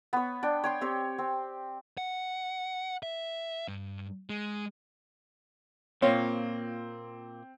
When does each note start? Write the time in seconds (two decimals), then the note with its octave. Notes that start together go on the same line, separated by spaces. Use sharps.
0.13 B3 C#5
0.43 D4 G5
0.64 C#5 G5 C6
0.81 C4 G4 C#5
1.18 C4
1.98 F#5
3.03 E5
3.68 G2
4.30 G#3
6.02 A#2 A#3 C4 F4 C#5